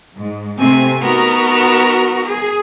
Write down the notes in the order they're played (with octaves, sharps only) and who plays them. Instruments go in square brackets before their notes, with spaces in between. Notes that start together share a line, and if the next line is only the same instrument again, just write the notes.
[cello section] G#2
[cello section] C3 A3 C4 [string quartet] G#5
[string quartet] B3 D#4 A#4 [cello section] F#4
[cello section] G#4